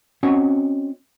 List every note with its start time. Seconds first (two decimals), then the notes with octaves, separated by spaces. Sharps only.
0.23 C4 C#4 F#4 D#5 F#5 G#5